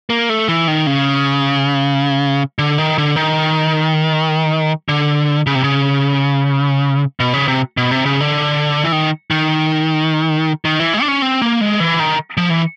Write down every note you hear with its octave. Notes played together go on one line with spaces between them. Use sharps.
A#3
A3
E3
D#3
C#3
D3
D#3
D3
D#3
D3
C#3
C3
C#3
B2
C#3
C3
B2
C3
C#3
D3
E3
D#3
D#3
D#3
E3
G#3
D4
C#4
C4
A#3
G#3
E3
D#3
F3
E3